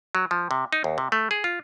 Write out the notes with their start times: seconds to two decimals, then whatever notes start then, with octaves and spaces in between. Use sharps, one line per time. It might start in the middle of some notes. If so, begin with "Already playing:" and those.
0.15 F#3
0.31 F3
0.51 C3
0.73 D#4
0.84 D#2
0.98 C3
1.12 A3
1.31 G#4
1.44 F4